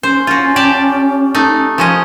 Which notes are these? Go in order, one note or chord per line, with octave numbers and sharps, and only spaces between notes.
C#4 C5
F4 F#4
G4 D5 A5
A3 D#4
F3 C#4 D#5